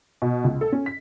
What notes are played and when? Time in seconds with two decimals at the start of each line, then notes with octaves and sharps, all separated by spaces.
0.22 B2
0.44 C#2
0.61 A4
0.72 C#4
0.86 B6